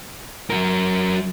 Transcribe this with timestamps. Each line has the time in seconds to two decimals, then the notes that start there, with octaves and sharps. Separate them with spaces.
0.50 F#3 A#4